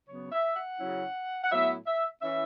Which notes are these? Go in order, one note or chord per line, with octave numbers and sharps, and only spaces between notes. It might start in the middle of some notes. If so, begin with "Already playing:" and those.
C#3 F#3 B3 C#5
E5
F#5
C#3 F#3 C#4 E4
F#5
A2 F#3 B3 E4 E5
E5
E3 C#4 E4 E5